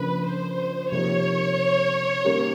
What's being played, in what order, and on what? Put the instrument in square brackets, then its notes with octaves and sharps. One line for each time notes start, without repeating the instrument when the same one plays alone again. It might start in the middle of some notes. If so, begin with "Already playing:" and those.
Already playing: [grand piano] C#3 F3 A#3 D4 [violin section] B4
[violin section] C5
[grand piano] C3 F3 A#3 D#4 G4 [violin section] C#5
[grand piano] D#3 G3 A#3 C#4